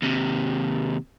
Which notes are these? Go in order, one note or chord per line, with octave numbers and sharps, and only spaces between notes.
D#2 C3